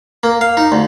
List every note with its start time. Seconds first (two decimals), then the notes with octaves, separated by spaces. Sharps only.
0.23 A#3
0.41 F5
0.57 D#4
0.72 D2